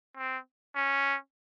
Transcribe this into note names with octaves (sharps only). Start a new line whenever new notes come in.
C4
C#4